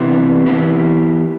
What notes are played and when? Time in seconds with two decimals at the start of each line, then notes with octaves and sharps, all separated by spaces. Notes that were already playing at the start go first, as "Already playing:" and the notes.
Already playing: C3 E3 B3 E4 G4
0.46 E3 B3 E4 G4